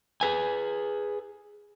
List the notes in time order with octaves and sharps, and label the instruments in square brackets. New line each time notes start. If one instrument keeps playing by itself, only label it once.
[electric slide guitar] G#4 B4 G#5